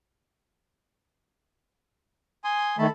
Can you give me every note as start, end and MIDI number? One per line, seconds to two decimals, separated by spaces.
2.44 2.76 80
2.44 2.76 84
2.44 2.76 87
2.78 2.87 51
2.78 2.87 57
2.78 2.90 69
2.78 2.90 81
2.78 2.90 83